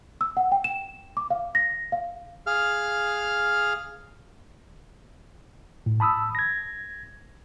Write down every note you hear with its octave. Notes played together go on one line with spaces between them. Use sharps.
E6
F#5
G5
E7
D6
F5
A#6
F5
G#4 F5 F6
A2
A5 B5 D#6 E6
G#6 A#6